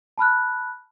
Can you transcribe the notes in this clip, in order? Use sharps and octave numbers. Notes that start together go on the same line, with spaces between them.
A5 B5 F6 F#6